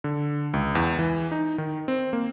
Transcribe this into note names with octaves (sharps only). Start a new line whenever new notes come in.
D3
C#2
E2
E3
D#4
D#3
C4
A#3